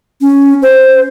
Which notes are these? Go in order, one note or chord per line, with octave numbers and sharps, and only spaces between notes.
C#4
C5